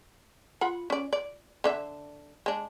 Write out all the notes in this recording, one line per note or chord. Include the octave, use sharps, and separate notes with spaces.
F4 F#5 B5
C#4 D5
D5
D3 D4 E5
G#3 D4